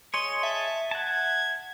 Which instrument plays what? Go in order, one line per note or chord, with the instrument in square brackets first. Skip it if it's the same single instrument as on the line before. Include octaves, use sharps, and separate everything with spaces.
[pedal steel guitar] G#4 C#5 D#5 [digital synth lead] C6
[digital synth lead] E5 [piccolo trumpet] A5
[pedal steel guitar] F#5 A5 [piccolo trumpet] G#6